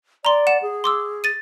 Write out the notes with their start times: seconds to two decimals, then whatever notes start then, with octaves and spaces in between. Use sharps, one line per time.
0.25 D5 A#5 C6
0.47 F#5 E7
0.62 G#4
0.84 C6 D6 E6
1.24 A6 D#7